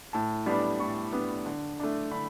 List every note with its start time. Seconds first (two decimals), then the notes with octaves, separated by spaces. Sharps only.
0.13 A2 A5
0.46 G3 B3 D4 B5
0.80 A2 C#6
1.13 G3 B3 D4
1.46 D3
1.80 A3 D4
2.11 D3 B5